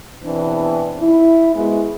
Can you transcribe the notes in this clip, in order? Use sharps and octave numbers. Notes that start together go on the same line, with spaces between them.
E2 B2 E3 C4 D4
E4
G#2 G#3 B3 E4 F#4 G#4